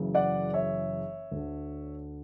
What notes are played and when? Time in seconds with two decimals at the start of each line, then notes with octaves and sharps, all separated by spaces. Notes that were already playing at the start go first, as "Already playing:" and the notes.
Already playing: F#1 F#2 C#3 E3
0.15 D5 F#5
0.54 C#5 E5
1.31 D2 D3